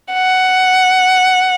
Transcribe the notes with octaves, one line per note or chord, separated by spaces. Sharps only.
F#5